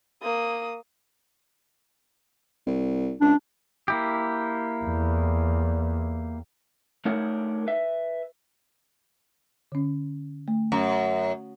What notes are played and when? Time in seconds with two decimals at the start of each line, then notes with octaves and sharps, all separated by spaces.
0.23 A#3 D#6
2.67 C2
3.21 C#2 D4
3.88 A#3 E4 G4
4.85 E2
7.05 A3 D4 D#4 A#4 C#5 F#5
7.67 B4 E5
9.72 D3 C#4
10.48 A3
10.72 F#2